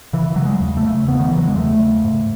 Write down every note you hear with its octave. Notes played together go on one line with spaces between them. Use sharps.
C#3 E3
C#3 F#3
G#3
E2
A3
C#3
C#3 B3
D#3
C#3 E3
F#3
G#3
E2 A3
C#3
G#2